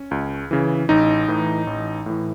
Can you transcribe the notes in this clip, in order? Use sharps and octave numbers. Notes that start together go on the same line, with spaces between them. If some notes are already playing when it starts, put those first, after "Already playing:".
Already playing: C#4
C#2
C#3 E3
A1 D#4
A2 E3
A1
A2 E3